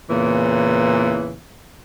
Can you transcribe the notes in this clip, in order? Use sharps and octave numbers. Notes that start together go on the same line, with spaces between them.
E2 A#2 C#3 E3